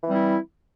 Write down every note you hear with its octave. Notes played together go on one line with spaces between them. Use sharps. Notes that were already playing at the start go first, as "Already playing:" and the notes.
E3 G3 C4 E4